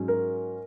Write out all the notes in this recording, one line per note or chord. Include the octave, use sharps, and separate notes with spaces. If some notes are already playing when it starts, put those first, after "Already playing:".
Already playing: G#2 F#3 C#4
A#4